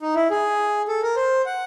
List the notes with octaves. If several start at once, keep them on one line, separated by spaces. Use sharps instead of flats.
D#4
E4
G#4
A4
A#4
C5
F#5